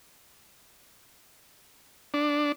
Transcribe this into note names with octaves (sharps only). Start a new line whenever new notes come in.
D4